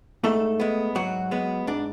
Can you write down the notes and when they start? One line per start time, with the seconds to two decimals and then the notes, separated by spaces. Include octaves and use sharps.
0.24 G#2 A3 A4
0.60 G#3 B3
0.95 G#2 F#3 F#4
1.31 G#3 B3
1.67 G#2 D4